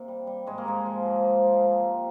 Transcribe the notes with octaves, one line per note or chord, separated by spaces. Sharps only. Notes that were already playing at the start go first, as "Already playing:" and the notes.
Already playing: C3 A#3
G3
G3
G#2 G#3
A#3
G#2 G#3
F3
F3
F3
F3
G#3
C3 A#3
C3 C4